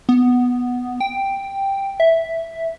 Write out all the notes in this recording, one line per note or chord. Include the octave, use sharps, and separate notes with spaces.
B3
G5
E5